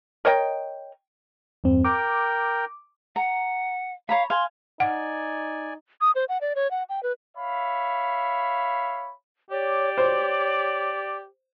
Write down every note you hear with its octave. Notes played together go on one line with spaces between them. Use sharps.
A#4 C#5 D#5 G5
E2 G2 C4
A#4 G5 D6
F#5 A#5
C#5 F5 A#5 B5
F5 G#5 C6
D#4 D5 F#5 G#5
D#6
C5
F#5
D5
C#5
F#5
G5
B4
C#5 E5 F5 B5
G4 C#5 D5
C5 C#5